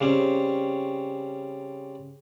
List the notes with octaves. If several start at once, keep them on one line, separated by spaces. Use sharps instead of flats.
C#3 G3 C4 C#4